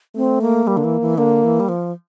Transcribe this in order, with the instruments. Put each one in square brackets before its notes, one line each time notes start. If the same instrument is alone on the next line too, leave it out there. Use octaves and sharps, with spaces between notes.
[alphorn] A3 [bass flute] C4
[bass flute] A#3
[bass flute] G3 [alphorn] A#3
[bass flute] D3
E3
E3
[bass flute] D3 [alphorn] A#3
[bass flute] E3
G3
F3